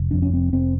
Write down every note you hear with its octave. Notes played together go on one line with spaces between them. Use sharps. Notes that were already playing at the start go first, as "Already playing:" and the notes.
Already playing: F1
F2 D4
C#4
F1 C4
F1 C4